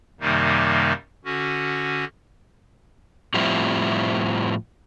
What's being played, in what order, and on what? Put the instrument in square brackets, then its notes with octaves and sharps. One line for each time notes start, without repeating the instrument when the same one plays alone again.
[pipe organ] F#2 C3 D#3 G3 A#3 D#4
D3 C#4 F#4
[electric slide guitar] A2 F3 G3 C4 E4